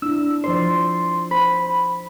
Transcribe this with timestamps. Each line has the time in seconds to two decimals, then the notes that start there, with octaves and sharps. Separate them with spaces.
0.02 D4 E4 E6
0.44 F3 C5 D5 C6
1.31 C5 B5